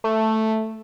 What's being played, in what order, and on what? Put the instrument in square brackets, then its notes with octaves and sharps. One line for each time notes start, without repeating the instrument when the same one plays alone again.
[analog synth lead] A3